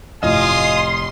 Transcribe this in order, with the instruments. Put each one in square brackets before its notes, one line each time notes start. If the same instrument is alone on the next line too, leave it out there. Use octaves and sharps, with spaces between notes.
[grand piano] F1 A2 F4 [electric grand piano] D#5 [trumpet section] F5 G#5 D#6 [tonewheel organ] C6